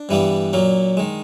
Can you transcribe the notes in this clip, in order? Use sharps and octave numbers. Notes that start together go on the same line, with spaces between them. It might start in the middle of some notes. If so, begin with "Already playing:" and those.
Already playing: D4
G2 E3 G3 B3
A#2 F#3 A#3
D#3 G#3